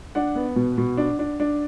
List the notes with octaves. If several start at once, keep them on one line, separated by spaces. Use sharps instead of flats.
D4 F#5
B3
B2
B2
D4
D4
D4